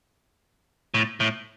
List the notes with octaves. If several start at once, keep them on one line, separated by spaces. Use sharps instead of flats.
A2
A2